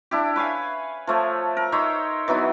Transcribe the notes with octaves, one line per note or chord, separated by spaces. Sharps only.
D4 E4 G4
B4 C#5 F5 G#5
F3 A3 C#5
A#4
D#4 C5 C#5 E5
E3 F#3 B3 D#4